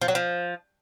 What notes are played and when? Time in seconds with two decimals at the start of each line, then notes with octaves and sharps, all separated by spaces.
0.01 F3
0.08 F#3
0.15 F3